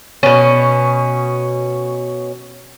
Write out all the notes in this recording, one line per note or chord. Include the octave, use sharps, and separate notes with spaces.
B2 C#4